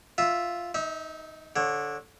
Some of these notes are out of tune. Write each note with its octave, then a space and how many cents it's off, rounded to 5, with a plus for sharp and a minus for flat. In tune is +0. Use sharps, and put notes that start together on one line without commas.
F4 +0 E5 +0
D#4 +5 E5 -35
D3 -10 C#5 -30